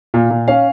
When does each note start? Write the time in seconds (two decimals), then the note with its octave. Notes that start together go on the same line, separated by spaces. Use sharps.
0.14 A#2 F5
0.30 A#2
0.48 C#4 F5